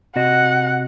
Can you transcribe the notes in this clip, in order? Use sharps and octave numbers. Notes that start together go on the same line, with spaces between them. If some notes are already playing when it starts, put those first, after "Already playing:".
C3 F#4 D#5 F#5